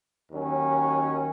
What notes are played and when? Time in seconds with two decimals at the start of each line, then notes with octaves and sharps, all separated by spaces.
0.31 D#2 D#3 F#3 C#4